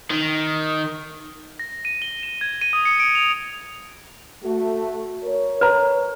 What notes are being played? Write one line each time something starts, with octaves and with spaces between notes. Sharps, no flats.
D#3
A#6
D#7
G7
E7
G#6
D#7
D#6
C#7
D7
F7
A3 F#4
A#4 C#5
B4 A#5